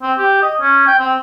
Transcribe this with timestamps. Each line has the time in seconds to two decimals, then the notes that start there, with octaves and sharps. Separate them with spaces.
0.02 C4
0.18 G4
0.42 D#5
0.61 C#4
0.88 G5
0.99 C4